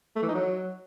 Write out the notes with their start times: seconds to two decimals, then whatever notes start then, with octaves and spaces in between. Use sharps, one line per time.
0.16 A3
0.22 E3
0.28 D#4
0.35 F#3